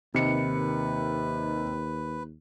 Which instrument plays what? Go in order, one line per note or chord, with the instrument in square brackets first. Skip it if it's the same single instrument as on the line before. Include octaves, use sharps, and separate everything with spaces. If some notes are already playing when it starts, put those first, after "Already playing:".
[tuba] D#2 [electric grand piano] C3 [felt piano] D#3 C#7 [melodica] B4